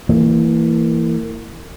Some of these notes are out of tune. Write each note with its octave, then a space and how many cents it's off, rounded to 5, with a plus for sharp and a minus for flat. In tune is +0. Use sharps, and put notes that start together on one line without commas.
E3 +0 A#3 -30